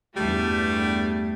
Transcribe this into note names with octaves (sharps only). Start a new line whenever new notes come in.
E2 G2 G3 A3